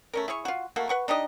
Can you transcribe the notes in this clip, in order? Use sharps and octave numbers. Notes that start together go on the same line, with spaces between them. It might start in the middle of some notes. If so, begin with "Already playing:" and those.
A3 C#4 A#4
E4 G#4 C#5 C#6
F4 F#4
A3 A#3 F#4
B4 F#5 C#6
D4 D#4 G4 D#5